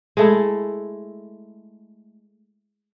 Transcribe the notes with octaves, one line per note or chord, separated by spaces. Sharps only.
G#3 A3 E4